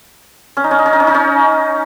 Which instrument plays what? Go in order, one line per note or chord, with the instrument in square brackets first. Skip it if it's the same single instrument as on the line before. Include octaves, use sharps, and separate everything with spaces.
[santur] C#4
D#4
C#4
D#4
C#4
D#4
C#4
D#4
C#4